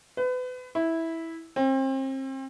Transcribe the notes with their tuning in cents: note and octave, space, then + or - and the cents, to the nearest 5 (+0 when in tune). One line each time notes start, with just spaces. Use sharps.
B4 +30
E4 -10
C4 +35